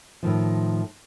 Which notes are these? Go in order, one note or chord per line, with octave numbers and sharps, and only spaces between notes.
A2 D#3 F3